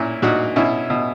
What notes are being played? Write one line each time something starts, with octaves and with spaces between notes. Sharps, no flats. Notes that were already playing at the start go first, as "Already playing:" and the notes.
Already playing: A#2 C#4 E4
A#2 D#4 F#4
B2 C#4 E4
B2